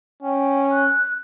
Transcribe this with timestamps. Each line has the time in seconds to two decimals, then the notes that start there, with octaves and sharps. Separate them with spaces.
0.23 C#4 G5
0.72 F#6